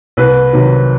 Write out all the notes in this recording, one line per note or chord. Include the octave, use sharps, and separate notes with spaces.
C2 B4
C3 D#3 F#3